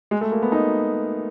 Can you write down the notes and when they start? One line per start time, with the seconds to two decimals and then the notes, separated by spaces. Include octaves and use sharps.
0.11 G#3
0.21 A3
0.32 A#3
0.42 B3
0.52 D#4